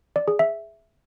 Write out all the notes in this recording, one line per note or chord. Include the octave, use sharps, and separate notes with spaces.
D5
G#4
E5